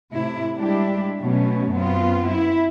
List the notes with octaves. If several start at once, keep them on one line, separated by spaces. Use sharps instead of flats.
A2 C3 E4
G3 G#3 D4 E4 G4
B2 F#3 A3 B3 C#4
F#2 B3 C4 F4
E4